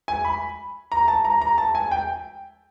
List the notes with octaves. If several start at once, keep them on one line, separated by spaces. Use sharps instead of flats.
G#5
B5
A#5
A5
A#5
A#5
A5
G#5
G5